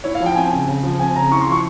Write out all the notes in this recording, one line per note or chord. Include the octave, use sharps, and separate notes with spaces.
E4 C#5
F5
F3
G5
C4 G#5
C#3
C#3
F3
C4 G#5
C#3 A#5
E4 C#6
C6
F3 C#6